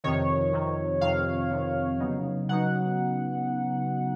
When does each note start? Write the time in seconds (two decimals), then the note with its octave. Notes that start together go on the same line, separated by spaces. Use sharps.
0.04 F2 C3 D#3 C#5
0.53 F2 C3 D#3
1.01 F2 C3 D#3 F5
1.51 F2 C3 D#3
2.00 C#3 F#3 B3 D#4
2.49 C#3 F#3 B3 D#4 F#5